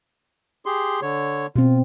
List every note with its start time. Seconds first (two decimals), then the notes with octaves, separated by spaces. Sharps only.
0.66 G4 G#4 C6
1.02 D3 C#5
1.56 B2 C4 F4